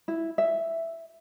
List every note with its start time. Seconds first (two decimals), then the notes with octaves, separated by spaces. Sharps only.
0.08 E4
0.38 E5